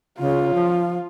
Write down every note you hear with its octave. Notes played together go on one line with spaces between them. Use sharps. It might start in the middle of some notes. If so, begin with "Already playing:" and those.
C#3 F4
F3